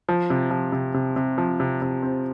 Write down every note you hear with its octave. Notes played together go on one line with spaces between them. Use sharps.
F3
C3
F3
C3
C3
C3
F3
C3
C3
C4